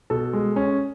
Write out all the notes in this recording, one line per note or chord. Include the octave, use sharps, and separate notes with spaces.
B2 A4
G#3
C#4